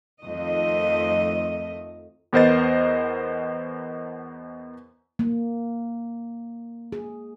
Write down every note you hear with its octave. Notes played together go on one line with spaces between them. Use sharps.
F2 D#3 A3 D#5
E2 B3 A#4 C5 D#5 A6
A#3
G#4